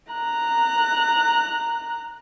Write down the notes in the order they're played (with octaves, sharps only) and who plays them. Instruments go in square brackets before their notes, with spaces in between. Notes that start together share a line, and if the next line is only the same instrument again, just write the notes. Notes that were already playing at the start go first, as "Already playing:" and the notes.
[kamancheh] A#5 F#6